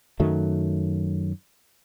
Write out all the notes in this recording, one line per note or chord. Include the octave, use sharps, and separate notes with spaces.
F#2 D#3 F#3 A3